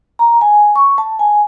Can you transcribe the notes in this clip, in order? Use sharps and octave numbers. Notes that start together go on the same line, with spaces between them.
A#5
G#5
C#6
A5
G#5